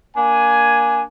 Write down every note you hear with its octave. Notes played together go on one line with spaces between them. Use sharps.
A#3 D4 G#5